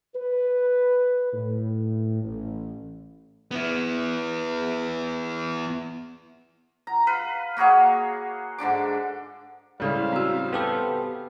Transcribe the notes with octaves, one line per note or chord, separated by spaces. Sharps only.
B4
A2
A1
B3 E4
A#5
B4 F5
A#3 F#4 G#4 C#5
G#2 D3 D4 D6
A2 C#3 G3 G#3 A4 C5 D5 F5
C4 F#4
B3 G4 A4